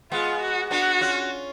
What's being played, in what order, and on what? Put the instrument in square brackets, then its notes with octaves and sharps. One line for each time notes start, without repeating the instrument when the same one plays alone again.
[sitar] G#3 B3 [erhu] F4
[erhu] F#4
[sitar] B3 D4 [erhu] F#4
[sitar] C#4 F4